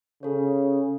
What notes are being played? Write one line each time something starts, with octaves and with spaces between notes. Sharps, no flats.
C#3 A4 C#5